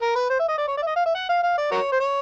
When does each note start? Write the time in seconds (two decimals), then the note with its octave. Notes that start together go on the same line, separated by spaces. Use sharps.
0.02 A#4
0.16 B4
0.30 C5
0.39 E5
0.49 D#5
0.58 D5
0.68 C#5
0.77 D5
0.82 E5
0.86 D#5
0.96 F5
1.06 E5
1.15 F#5
1.29 F5
1.43 F5
1.58 D5
1.71 F#4 A#4 C#5
1.92 C5
2.00 C#5